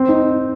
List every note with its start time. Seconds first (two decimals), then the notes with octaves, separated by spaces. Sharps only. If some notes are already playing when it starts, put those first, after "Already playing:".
Already playing: C4
0.09 D#4